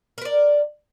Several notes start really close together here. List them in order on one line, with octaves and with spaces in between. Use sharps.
A#4 B4 D5